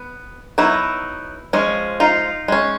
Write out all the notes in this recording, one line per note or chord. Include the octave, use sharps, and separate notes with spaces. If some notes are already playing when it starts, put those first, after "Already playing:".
Already playing: B3
F#3 B3 D#4 E4
F3 G#3 C#4
D#4 F4
G#3 C#4